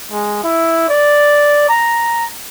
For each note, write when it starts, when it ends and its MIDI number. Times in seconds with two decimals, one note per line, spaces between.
0.11 0.41 56
0.44 0.85 64
0.89 1.67 74
1.68 2.27 82